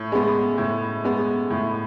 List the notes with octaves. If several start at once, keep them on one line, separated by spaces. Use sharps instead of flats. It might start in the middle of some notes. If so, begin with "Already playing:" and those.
Already playing: A2
G#3 B3
A2
G#3 B3
A2